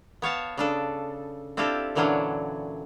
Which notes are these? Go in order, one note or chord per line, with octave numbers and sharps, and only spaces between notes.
B3 C#5 F5 A5
C#3 D4 A4
C4 D4 E4 F4 G4 A4
A#2 D3 E3 F#3 C#4 D4